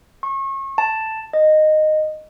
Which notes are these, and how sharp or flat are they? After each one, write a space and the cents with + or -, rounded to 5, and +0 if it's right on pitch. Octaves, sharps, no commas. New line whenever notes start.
C#6 -35
A5 +5
D#5 -10